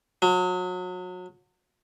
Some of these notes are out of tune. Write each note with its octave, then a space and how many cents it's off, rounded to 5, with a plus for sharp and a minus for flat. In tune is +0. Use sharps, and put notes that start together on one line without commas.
F#3 -30